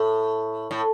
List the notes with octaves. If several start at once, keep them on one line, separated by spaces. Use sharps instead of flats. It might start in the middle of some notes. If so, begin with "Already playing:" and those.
Already playing: A2
A2